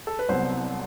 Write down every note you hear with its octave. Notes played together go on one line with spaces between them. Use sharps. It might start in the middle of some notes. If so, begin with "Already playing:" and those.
A4
B4
C2 C3 F#3 B3 C5